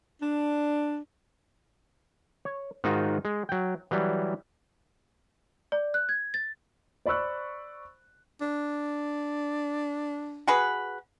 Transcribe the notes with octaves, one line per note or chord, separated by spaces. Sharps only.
D4
C#5
G#2 D#3 D#4 F4 F#4
G#3
F#3 G5
E3 F#3 G3
D5
F#6
G#6
A6
C5 D5 B5 C#6 E6 F#6
D4
F#4 G#4 B4